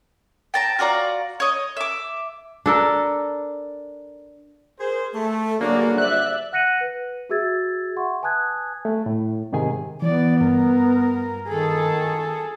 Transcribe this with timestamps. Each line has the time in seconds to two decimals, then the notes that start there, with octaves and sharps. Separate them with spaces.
0.54 G5 A5 A#5
0.79 F4 F#4 D5 A#5
1.40 C#5 D#5
1.77 E5 D6
2.66 D4 A4 A#4
4.80 G#4 A#4 C5
5.14 A3 A4
5.61 D3 F#3 G3 A#3 D4 F#4 G#4 D5
5.98 C5 D5 E5 F#6
6.53 F#5 F#6 A#6 C#7 D#7 F#7
6.81 B4
7.30 F#4 G#4 E5 E6 G#6 A6
7.96 E5 F#5 C6 C#6
8.22 B4 G#5 A5 D#6 F#6 G#6
8.85 A3
9.06 A2
9.53 G#2 C3 D#3 G#4 G#5
10.02 E3 B3 D5
10.41 G2 A#4
11.48 D#3 G#4 A4